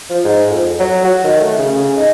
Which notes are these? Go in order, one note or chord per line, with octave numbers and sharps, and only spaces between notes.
F3
G#2
F2
F#3
F#4
D#3
A3
C#3
C#3
D#4